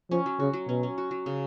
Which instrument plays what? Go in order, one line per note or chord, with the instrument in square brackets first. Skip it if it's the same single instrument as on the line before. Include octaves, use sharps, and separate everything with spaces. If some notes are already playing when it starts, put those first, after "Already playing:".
[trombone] F3 [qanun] C#4
[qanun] F#3
[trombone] C#3 [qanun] F#4
[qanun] F#3
[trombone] B2 [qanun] C#4
[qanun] C#4
F#4
F#3
C#3